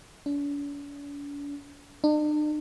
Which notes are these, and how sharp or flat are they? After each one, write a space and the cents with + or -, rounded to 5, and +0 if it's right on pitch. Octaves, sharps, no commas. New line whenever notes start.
D4 -45
D4 +45